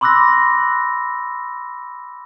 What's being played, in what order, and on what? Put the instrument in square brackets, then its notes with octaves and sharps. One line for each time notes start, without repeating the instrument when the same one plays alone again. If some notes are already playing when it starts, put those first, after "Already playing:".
[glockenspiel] B5 C6 D6 E6 F#6 A#6